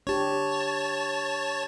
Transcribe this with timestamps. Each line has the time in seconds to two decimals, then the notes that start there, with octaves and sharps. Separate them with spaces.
0.07 D4 G4 C#5 A5